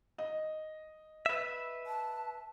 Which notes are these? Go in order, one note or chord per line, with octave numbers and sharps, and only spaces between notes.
D#5
B4 E5
A5